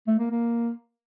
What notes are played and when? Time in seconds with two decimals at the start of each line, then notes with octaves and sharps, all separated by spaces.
0.07 A3
0.19 A#3
0.30 A#3